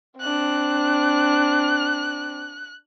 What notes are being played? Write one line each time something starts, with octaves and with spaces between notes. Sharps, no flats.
C4 D4 F#6